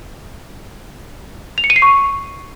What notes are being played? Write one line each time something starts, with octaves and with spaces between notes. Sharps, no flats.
F7
C#7
D#7
C7
C#6